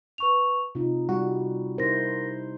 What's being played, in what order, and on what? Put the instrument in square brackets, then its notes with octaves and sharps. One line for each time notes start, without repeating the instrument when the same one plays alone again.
[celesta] B4 C#6 F7
[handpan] C3 D#4 [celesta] F4
[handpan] G3 [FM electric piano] F#4
[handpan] D#4 E4 C5 [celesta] A#4 A#6